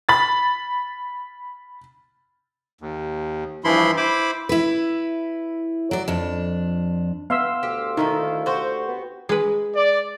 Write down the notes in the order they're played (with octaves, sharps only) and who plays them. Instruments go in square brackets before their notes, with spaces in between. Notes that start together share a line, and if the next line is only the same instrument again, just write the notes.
[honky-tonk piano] B5 A6
[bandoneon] D#2
G2 E3 F3 E4 B5 C6
E4 C5 B5 D6
[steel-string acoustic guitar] E4 B4
F#3 D5
F2 D4
[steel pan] B3 E5 [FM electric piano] F5 C6 E6
[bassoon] D2 [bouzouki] G4
[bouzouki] D#3 E4 A4 [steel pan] D#4
[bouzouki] F#4 G4 C5
[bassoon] B3
[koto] G#3 B4
[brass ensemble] D5